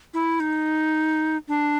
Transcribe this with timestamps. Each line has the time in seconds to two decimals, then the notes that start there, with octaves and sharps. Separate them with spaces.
0.14 E4
0.40 D#4
1.48 D4